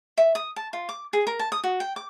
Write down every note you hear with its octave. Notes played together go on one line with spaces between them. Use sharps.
E5
D#6
A5
F4
D6
G#4
A#4
A5
D#6
F#4
G5
D6